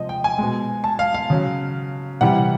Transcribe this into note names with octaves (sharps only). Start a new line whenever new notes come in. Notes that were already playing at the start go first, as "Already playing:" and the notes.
Already playing: C3 F3 G#3 D#5
G5
G#5
B2 G#3
A5
F5
F5
C#3 F#3
C3 E3 G3 F#5